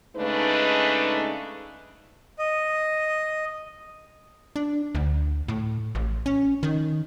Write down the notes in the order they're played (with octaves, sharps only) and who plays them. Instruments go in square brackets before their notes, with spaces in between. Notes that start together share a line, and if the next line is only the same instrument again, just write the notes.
[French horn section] C#3 G#3 A3 D4 D#4 B4
[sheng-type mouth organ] D#5
[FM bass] D4
D2
A2
A1
C#4
D#3